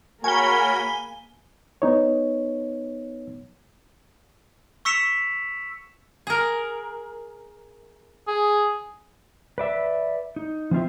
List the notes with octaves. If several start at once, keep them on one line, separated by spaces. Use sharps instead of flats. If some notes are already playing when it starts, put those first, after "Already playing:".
A#3 F#4 G#4 A#4 C#5 G#5 B5 G7
B3 D#4 C#5
C#6 E6 B6 C#7 E7 F7
G#4 A#4
G#4
B4 D5 E5
D#4
F3 C4 F4 E5